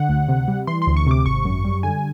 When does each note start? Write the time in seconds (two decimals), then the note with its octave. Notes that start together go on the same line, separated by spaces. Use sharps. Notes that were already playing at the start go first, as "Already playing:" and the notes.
Already playing: D3 F#5
0.09 D2
0.29 C3
0.48 G3
0.67 E3 C6
0.82 C6
0.87 D2
0.96 C#6
1.07 C3 D6
1.25 G#1 C#6
1.45 F#2
1.64 G3
1.83 D3 G#5